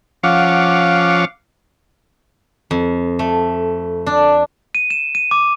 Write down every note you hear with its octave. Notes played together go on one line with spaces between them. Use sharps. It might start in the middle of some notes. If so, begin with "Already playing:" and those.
F3 C#4 F5 F#5 D6
F2
A3
D4
D#7
E7
D#7
D6